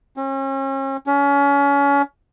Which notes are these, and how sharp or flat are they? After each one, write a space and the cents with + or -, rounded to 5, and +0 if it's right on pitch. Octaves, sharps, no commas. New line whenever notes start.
C#4 -40
C#4 +30